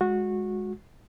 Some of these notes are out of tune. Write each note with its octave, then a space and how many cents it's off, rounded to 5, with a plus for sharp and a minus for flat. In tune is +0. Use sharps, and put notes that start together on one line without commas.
G#3 +0 F#4 -20